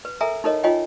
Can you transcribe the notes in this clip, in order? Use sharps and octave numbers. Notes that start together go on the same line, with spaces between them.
B4
A4 A#4 E5 G#5 A#5
D#4 E4 A4 A#4 C#5 D#5
D#4 F4 C#5 D#5 G5 G#5